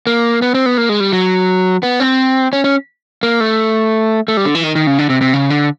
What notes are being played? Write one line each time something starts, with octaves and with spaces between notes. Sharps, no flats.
A#3
B3
C4
B3
A#3
G#3
G3
F#3
B3
C4
C#4
C#4
A#3
A3
A3
G3
D3
E3
D#3
D#3
C#3
D3
C3
C3
C#3
D3